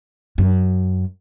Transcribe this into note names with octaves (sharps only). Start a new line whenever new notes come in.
F#2 D4